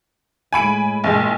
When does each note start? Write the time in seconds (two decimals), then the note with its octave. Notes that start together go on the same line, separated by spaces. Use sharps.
0.53 A2 G#3 G#5 B5 D7
1.04 A1 A#2 G#3